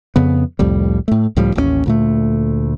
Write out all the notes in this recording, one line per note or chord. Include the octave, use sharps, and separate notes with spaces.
F2 C#3 B3
C2 F2 A2 G3
A2 A3
C#2 A2 F3 G3
A1 D#2 A#3 C#4
D2 A#2 A3